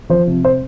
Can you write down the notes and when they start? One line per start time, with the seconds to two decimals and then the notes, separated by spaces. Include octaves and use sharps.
0.09 F3 C5
0.27 C3
0.45 C5